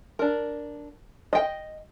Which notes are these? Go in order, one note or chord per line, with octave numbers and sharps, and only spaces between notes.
D4 A#4
D#5 G5